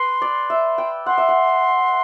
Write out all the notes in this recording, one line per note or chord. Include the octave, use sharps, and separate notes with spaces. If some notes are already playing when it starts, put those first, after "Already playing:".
Already playing: B4 C6
D5
E5
G5
F#5 C6
E5
F#5